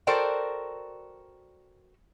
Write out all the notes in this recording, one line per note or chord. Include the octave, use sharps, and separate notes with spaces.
F#4 A4 A#4 C5 D5 G5